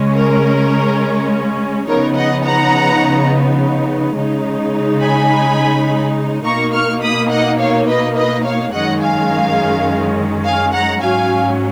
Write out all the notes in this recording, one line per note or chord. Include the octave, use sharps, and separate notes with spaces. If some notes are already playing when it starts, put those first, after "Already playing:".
Already playing: C#3 G#3 C#4
A#4
C#3 F3 B3 D#4 A#4 C#5
D#5 F#5
F#5 A#5
C#3 G#3 D#4
G#5 B5
B2 A#3 D#4 A#5 C#6
C#6 F6
B5 D#6
D#5 F#5
C#5 F5
B4 D#5
B4 D#5
C#5 F5
F#2 D#3 G#3 C#4 D#5 F#5
F5 G#5
F5 G#5
F#5 A#5
G#2 F#3 C#4 F5 G#5